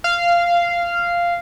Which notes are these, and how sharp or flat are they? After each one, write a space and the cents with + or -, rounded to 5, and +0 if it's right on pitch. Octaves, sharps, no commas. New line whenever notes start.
F5 -10